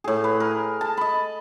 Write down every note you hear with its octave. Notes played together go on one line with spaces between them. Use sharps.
A2 G#4
B4
A#4
A5
D#5 B5